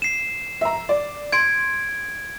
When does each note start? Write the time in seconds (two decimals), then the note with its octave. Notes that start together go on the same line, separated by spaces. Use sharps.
0.02 C7 E7
0.61 E5 A#5
0.89 D5
1.32 C6 G#6 D7